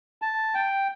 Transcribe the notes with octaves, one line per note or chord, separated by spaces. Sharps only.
A5
G5